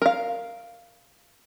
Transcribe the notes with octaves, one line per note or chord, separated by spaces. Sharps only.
A#4 F5